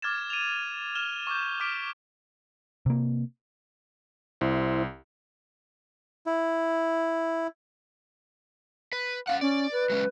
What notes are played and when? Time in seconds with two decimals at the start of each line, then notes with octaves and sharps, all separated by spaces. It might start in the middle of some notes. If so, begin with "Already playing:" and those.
0.02 D6 F6 G#6 A6 E7
0.30 D#7 F7
0.95 F6 E7 G7
1.27 C#6 D6 F6 G6
1.60 D6 F6 B6 D7
2.86 C3 A#3
4.41 C2 E4 C5
6.26 E4
8.93 B4
9.27 C#4 D4 F5 F#5
9.41 C#4 D5
9.72 B4
9.90 F#3 G#3 C#4